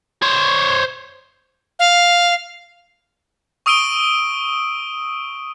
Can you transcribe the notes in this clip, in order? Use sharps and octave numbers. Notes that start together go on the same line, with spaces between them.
C5 C#5
F5
C#6 D#6 E6 D7 D#7 G7